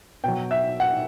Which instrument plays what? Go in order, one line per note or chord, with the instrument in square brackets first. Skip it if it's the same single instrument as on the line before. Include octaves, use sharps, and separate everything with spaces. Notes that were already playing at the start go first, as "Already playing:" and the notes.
[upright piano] B2 F#3 G5
E5
F#5